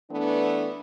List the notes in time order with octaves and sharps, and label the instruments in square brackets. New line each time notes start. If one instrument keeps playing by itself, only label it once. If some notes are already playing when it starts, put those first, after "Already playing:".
[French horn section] E3 A3 B3 D4